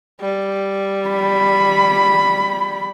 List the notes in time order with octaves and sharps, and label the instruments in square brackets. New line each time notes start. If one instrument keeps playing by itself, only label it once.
[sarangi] G3
[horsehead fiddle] B5